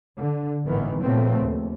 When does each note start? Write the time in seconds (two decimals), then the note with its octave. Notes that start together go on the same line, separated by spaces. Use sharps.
0.17 D3
0.65 G#1 A2 D#3 E3 B3
1.02 A#2 C#3 F3 A3 B3 C4
1.40 D#2